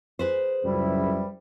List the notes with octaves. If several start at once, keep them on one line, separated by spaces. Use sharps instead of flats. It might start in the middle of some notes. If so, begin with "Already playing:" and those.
G#4 B4 C5
C#2 F#2 G3 E4